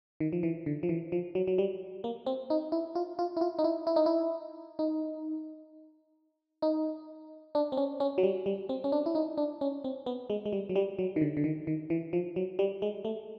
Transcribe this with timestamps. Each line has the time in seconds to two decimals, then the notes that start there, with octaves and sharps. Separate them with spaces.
0.20 D#3
0.33 F3
0.43 E3
0.66 D3
0.83 F3
0.89 E3
1.12 F3
1.35 F#3
1.47 F#3
1.58 G3
2.04 A#3
2.26 C4
2.50 D#4
2.72 E4
2.95 F4
3.19 F4
3.37 E4
3.41 F4
3.59 D#4
3.64 E4
3.87 E4
3.96 D#4
4.06 E4
4.79 D#4
6.62 D#4
7.55 D4
7.72 C4
7.77 C#4
8.00 C#4
8.18 F#3
8.23 G3
8.46 G3
8.69 C4
8.84 C#4
8.92 D4
9.06 E4
9.15 D#4
9.38 D4
9.61 C#4
9.84 C4
10.06 B3
10.30 G#3
10.46 G#3
10.53 G3
10.69 F#3
10.76 G3
10.99 F#3
11.16 D#3
11.21 D3
11.37 D3
11.44 D#3
11.67 D#3
11.90 E3
12.13 F3
12.36 F#3
12.59 G3
12.82 G#3
13.05 A3